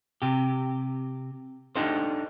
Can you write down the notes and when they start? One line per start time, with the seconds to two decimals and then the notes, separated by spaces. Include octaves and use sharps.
0.22 C3 G4
1.76 D4 D#4 G4 A4 C5